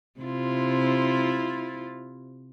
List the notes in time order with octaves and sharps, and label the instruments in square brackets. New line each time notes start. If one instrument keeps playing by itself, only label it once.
[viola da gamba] C3 E4 F4